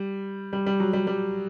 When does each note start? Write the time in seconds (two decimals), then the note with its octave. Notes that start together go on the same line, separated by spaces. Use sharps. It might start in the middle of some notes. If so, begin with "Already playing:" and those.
Already playing: G3
0.53 G3
0.66 G3
0.80 F#3
0.93 G3
1.07 G3